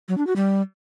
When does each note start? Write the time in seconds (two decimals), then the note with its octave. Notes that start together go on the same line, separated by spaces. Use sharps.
0.08 F#3
0.18 D4
0.27 F#4
0.36 G3